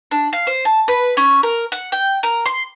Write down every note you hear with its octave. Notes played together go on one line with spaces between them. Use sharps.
D4
F5
C5
A5
B4
C#4
A#4
F#5
G5
A#4
C6